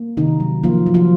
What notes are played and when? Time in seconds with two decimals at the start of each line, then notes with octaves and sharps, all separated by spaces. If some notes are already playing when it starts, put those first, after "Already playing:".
Already playing: A#3
0.17 C3 D#3 D#4
0.40 F#3
0.63 F3 A#3 F4
0.86 F#3
0.94 F3 F4